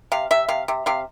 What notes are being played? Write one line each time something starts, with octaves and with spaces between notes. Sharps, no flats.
C3 F5
C3 E5
C3 F5
C3
C3 F5